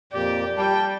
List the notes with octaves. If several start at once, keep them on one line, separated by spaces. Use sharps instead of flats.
F2 A#2 G4 D5
G3 G5 A5